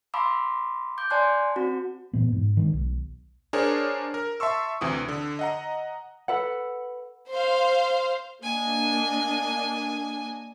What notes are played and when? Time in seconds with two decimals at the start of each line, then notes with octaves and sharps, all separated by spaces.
0.14 F5 A5 B5 C6 D6 E6
0.98 D6 G6
1.10 D5 G#5 A5 C6 F#6
1.56 C4 F#4
2.13 A#2 E3 B3
2.32 G#2
2.57 D#3 G3 G#3
2.73 B1
3.53 D4 G#4 A#4 C5 C#5
4.14 A#4
4.40 E5 A5 C6 C#6 E6
4.81 D2 C3 E3 D#6
5.09 D3
5.39 D#5 F#5 A#5
6.28 A4 B4 F#5
7.30 C5 F5
8.43 A#3 D4 D#5 G#5